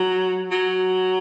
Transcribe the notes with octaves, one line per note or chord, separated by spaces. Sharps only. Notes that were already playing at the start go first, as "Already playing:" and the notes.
Already playing: F#3
F#3